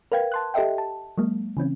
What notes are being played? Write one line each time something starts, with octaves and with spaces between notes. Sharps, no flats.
A#4 B4 F5 G5 G#6
A5 C6 F#6
G4 A4 D#5 E5 G5
A5
F#3 G#3 A#3
C#3 E3 C4 C#4